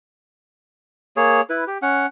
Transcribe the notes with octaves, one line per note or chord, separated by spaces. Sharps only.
A#3 G#4 C#5
E4 B4
G4
C#4 F#5